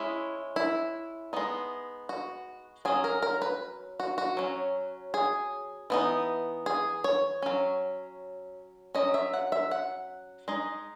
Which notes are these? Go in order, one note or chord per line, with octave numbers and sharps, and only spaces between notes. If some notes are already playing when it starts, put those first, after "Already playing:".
Already playing: G#3 C#4 E4
E4
G#3 B3 D#4
F#4
F#3 C#4 G#4
A#4
A#4
B4
F#4
F#4
F#3 C#4
G#4
E3 B3 D#4
G#4
C#5
F#3 C#4
F#3 C#4 D#5
E5
F#5
E5
F#5
G#3 D#4